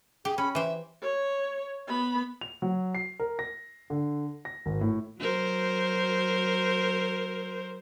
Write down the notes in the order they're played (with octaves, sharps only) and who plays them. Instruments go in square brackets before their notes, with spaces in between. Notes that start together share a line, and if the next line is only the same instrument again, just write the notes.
[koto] G4 [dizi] G#4
[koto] C#4 [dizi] B5
[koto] E3 C5 [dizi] E5
[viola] C#5
B3 B5
[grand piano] F7
F#3
C7
A#4
A#6
D3
A#6
G#1
A2
[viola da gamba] F#3 A#4 C5